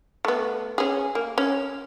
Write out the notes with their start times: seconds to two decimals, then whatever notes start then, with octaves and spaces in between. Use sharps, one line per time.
0.25 A3 B3
0.78 C#4 G#4
1.15 A#3
1.38 C#4